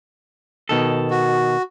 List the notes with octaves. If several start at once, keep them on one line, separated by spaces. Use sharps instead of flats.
B2 D#3 A4
F#4